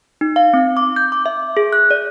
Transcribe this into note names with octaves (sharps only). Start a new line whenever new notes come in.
D#4
F5
C4
D6
G6
D6
E5
G#4
F#6
D5